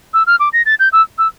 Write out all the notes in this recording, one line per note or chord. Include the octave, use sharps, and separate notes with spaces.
E6
F6
D6
A#6
A6
G6
E6
E6